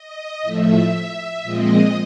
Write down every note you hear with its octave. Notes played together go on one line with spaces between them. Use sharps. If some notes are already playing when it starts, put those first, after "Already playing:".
Already playing: D#5
A2 F3 A3 E5
A#2 F3 G#3 C4 D#5